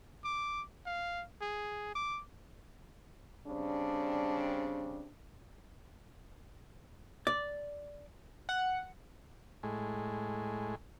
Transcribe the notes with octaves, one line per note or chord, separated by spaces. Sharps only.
D6
F5
G#4
D6
C#3 G3 C4 D4
D5
F#5
A2 G#3